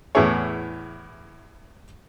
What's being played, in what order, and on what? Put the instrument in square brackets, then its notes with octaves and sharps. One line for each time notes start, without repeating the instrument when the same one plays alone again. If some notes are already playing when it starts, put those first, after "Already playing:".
[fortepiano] E2 A2 B3 E4 G#4 C#5